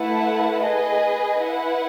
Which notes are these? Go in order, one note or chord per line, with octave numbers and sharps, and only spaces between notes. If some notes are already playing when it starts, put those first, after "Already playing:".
Already playing: A3 E4 B4 F#5 A5
G#4 B4 D#5
E4 B4 F#5